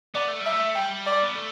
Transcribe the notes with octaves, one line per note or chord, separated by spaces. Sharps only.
B3 D5
A3
G3 E5
A3
G3 G5
D5
B3
A3